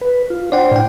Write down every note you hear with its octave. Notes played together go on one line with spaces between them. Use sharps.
B4
F4
D4 C5 D5 F#5 G5
A2 G5